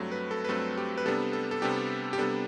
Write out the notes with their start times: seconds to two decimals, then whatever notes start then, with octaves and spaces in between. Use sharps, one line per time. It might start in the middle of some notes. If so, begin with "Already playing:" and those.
Already playing: G2 F#3 A3 C4
0.12 B4
0.31 A4
0.44 B4
0.49 G2 F#3 A3 C4 A4
0.77 G4
0.98 B4
1.06 C3 G3 B3 D4 A4
1.33 A4
1.51 A4
1.62 C3 G3 B3 D4 G4
2.13 G4
2.18 C3 G3 B3 D4 A4